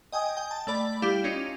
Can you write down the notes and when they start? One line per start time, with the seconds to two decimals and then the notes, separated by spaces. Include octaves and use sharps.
0.12 D#5 G5 G#5 D#6
0.37 G5
0.51 A5
0.67 A3 D5 B5
1.02 G3 E4 G4 F5
1.24 C#4 D#4 F4